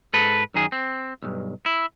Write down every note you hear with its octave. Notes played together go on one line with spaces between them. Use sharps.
G#2 A4 B4
F#2 D#3 G#4
C4
B1 G2
E4